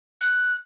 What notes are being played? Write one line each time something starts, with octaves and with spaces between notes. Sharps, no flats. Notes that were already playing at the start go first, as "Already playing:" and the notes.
F#6